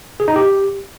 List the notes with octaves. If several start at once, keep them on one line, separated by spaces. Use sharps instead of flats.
G#4
D#4
G4